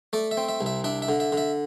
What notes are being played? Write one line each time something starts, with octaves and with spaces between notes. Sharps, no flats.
A3 D5
E5
C4
E5
C2
E5
D4 E5
E5
D3
E5
D3 E5